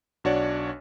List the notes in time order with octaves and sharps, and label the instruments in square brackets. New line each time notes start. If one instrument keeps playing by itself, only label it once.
[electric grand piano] B1 D4 F#4 C#5 D5